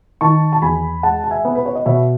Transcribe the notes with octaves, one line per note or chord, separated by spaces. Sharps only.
D#3 A5 C#6
A5
E2 G#5 B5
G#3 F#5 A5
A5
E5 G#5
B3
B4
C#5
D#5
B2 C#5 E5